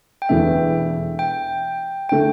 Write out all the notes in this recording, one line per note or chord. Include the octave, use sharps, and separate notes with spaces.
G5
E1 E2 E3 A3 D4 E5
G5
D3 A3 G5